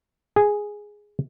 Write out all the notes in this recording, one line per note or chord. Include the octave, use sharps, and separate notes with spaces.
G#4